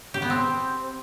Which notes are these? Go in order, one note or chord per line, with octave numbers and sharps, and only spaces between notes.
G4
B3
C4